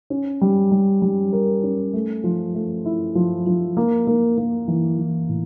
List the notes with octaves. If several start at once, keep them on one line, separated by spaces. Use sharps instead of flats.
C#4
G3
G3
G3
A#4
C#4
A3
F3
A3
E4
F3
F3
A#3
A#3
A#3
E3
E3
A2